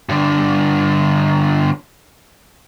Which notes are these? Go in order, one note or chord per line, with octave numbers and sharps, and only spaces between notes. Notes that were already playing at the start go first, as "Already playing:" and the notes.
G2 D3